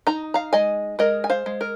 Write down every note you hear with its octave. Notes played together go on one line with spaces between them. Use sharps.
D#4 A#5
F5 A#5
G#3 D#5 G#5
G#3 A#4 D#5
G#5
C5 F5
G#3
A#4